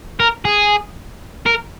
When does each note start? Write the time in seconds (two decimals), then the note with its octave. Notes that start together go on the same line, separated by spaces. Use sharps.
0.20 A#4
0.45 G#4
1.46 A#4